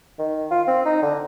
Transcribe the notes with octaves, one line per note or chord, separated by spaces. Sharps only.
D#3
F4
C4
D#4
D3